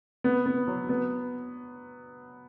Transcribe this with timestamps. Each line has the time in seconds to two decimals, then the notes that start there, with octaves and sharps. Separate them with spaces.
0.24 B3
0.46 B3
0.67 F#3
0.89 B3